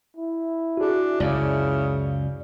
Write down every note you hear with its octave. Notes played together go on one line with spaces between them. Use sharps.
E4
D4 F#4 G#4
C#2 F#2 C#3 D5